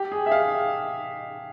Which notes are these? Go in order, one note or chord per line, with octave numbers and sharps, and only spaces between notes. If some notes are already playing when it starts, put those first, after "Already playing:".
Already playing: G4
G#4
E5
F5